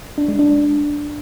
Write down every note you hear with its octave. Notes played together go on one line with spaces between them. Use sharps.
D4
G#3
D4